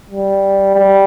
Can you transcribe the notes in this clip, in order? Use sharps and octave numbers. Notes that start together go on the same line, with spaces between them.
G3
G3